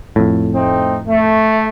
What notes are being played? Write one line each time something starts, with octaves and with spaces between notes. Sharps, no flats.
F2 A2
A3 C4 D#4
A3